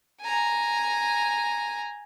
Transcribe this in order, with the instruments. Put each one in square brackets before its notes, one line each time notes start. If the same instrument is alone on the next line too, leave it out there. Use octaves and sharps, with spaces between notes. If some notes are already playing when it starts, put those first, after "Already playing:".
[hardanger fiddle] G#5 A#5